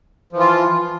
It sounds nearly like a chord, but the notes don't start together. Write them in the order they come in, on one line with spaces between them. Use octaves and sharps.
F3 E3 F4